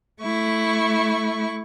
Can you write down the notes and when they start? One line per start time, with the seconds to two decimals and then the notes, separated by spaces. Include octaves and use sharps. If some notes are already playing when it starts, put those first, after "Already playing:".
0.22 A3 E4 C#6